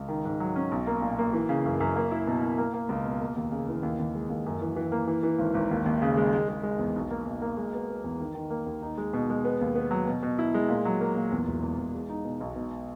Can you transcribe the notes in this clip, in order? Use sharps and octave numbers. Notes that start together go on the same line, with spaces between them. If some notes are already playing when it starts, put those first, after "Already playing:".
Already playing: C#2
D#3
G#2
F#3
C#4
B1
A#3
A#2
A#3
E3
C#3
F#2
F#2
A#3
E4
B2
E4
A#3
A#3
C#2
B2
A#3
D#2
C#3
E3
D#2
D#2
G#3
D#2
F#2
E3
E3
A#3
E3
E3
G#1
G#1
D#2
D#2
C#3
G#3
G#3
G#3
G#3
E2
B1
A#3
B1
A#3
G#3
B3
B3
E2
D#3
D#3
A#3
D#2
D#4
G#3
B2
G#3
B3
D#2
B3
F#3
B2
B2
E4
G#3
A#2
F#3
A#3
A#2
E2
E1
E2
E2
G#3
D#4
B2
B1
B2